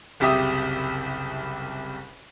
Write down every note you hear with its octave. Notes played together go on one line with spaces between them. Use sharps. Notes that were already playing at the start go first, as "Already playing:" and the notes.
F#1 C2 C3 G4 E5 D#6